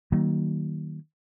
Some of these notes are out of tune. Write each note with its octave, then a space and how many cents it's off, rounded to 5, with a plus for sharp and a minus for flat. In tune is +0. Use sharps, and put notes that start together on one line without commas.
D#3 +0 F#3 +35 A#3 +0